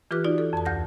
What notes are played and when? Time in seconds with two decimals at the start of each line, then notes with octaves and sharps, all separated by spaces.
0.11 E3 F4 G4 B4 D6 F#6
0.24 D#4 F4 F#4 D5
0.38 A4
0.53 F2 A5
0.66 D2 G6 A#6